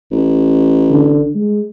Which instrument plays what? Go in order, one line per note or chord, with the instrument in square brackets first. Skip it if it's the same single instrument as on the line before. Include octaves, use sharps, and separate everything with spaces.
[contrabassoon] A1
[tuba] D3
G#3